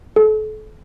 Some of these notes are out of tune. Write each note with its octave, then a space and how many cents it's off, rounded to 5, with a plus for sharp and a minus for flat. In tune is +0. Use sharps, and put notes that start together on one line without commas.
A4 -35